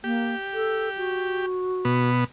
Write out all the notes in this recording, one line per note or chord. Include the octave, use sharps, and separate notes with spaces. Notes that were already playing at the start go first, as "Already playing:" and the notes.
A#3 G4
A4
F#4
B2 B3